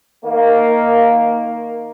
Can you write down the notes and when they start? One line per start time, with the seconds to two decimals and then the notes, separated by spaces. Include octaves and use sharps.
0.25 D#3 A#3